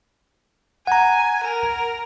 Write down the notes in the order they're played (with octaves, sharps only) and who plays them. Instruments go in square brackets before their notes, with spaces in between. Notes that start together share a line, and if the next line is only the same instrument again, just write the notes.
[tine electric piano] F#5 A#5 [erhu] G#5
[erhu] A#4